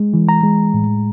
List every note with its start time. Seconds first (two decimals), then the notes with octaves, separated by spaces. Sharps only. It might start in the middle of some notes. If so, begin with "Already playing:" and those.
Already playing: G#3
0.13 E3
0.29 A#5
0.43 G#3
0.74 A2